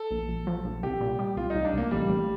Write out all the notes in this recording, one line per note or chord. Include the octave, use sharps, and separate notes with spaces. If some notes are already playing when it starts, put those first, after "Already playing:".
Already playing: A4
A#1
A#1
F3
A#1
C2 G4
A#2
G3
C2 F4
C2 D#4
D4
C2 A#3
A1 G3
A1